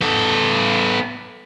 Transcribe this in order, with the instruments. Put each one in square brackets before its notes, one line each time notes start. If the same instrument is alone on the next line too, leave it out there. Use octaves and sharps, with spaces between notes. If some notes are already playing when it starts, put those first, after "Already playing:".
[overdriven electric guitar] B3 A4